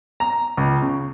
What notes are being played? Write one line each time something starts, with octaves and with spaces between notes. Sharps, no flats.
A#5
C#2
C#3